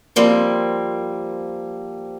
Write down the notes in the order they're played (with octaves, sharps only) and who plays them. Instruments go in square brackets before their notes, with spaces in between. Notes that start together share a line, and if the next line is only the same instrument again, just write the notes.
[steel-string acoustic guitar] F3 G3 A#3 C4